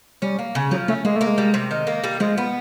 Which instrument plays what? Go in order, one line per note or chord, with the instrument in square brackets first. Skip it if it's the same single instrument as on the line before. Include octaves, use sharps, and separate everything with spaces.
[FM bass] G3 [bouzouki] C#4
[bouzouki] A#3
C#3
[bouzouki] F3 [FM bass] F#3
[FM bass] A3 [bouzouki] C#4
[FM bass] G#3 [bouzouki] A#3
[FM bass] A3 [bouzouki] A#3
[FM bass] G#3
[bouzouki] G3
C3
D#3
A#3
G3
[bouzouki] F3 [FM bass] G#3
[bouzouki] B3